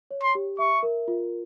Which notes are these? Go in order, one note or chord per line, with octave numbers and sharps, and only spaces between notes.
C#5
C6
G4
E5 C#6
A#4
F4